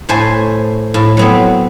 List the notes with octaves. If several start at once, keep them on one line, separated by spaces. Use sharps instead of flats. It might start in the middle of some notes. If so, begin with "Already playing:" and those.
A2 A3 C5 G#5
A2
F#3 B3 C4